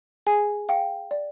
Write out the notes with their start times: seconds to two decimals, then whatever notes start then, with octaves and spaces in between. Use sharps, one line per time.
0.27 G#4 G#5
0.69 F5 G5
1.11 D5